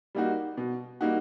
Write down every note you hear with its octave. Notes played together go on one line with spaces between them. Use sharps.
G3 A#3 D#4 F#4
B2
G3 A#3 D#4 F#4